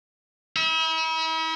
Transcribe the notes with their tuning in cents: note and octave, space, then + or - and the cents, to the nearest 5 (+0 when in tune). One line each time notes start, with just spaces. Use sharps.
E4 -40